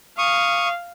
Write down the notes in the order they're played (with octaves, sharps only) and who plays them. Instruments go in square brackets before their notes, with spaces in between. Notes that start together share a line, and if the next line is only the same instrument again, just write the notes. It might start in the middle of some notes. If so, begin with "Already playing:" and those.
[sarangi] F5 [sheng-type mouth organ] C#6 D#6